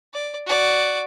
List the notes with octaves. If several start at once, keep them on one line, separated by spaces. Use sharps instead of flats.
D5
F#4 D5